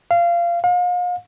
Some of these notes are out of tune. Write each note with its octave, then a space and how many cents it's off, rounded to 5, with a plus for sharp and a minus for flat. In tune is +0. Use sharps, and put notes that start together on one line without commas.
F5 -20
F5 +40